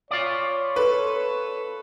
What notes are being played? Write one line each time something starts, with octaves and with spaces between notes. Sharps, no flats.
F4 C#5 D5
A4 B4